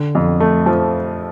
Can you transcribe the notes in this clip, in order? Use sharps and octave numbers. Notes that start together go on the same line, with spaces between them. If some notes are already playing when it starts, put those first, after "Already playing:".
Already playing: D3
F2
A3
F3